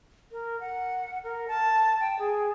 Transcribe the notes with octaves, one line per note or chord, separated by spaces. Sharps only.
A#4
F#5
A#4
A5
G5
G#4